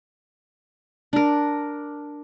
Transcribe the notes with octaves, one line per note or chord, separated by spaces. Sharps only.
D4 A#4